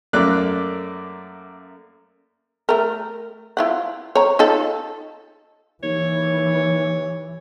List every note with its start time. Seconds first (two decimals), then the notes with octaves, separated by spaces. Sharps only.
0.13 F#2 A3 A#3 D5 F#6
2.69 A3 A#4
3.57 E4 F4 F#5
4.15 C#5 A#5
4.39 D#4 F4 A4
5.83 D#2 E3 C#5